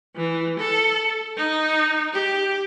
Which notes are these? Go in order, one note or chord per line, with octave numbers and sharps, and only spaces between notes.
E3
A4
D#4
G4